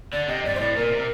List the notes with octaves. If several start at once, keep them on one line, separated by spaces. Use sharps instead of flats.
D3 D5
C3 D#5
G2 D5
C5
A2 D5
A#2 A#4
C3